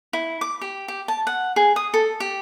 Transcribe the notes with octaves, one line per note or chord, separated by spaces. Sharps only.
E4
D6
G4
G4
A5
F#5
G#4
D#6
A4
G4